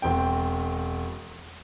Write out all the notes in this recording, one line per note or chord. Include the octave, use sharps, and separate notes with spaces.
E1 C4 G5